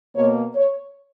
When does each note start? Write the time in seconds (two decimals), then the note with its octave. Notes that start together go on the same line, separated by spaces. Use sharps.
0.15 B2 A#3 C#5
0.55 C#5